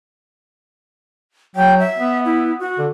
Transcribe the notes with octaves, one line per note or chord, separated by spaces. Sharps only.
F#3 G5
E5
B3
E4
F#4
D3